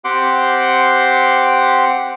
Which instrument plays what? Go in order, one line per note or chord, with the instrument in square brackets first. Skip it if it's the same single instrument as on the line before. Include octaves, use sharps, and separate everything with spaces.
[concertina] C4 G4 F#5 C6 D6